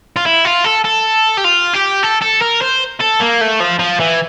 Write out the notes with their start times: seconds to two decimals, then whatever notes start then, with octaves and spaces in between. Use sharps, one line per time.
0.16 F4
0.26 E4
0.45 F4
0.64 A4
0.84 A4
1.37 G4
1.44 F4
1.74 G4
2.03 A4
2.22 A4
2.42 A#4
2.62 C5
3.01 A4
3.20 A#3
3.41 A3
3.60 F3
3.79 F3
4.00 E3